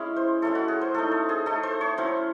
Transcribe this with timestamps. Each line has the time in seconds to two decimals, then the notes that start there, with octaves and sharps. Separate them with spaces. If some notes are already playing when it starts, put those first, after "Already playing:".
Already playing: G#3 C#4 E4
0.16 C5
0.42 G#3 C#4 E4 A4
0.55 F#4
0.68 G#4
0.81 C5
0.94 A3 D#4 A4
1.11 A4
1.29 G#4
1.46 A3 D#4 A4
1.63 C5
1.81 C#5
1.98 F#3 C#4 E4 C5